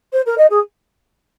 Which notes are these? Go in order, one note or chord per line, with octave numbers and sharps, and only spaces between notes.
C5
A#4
D#5
G#4